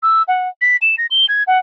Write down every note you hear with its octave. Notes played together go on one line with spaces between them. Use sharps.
E6
F#5
B6
E7
A#6
G7
G#6
F#5